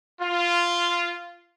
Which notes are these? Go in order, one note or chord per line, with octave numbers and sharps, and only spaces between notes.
F4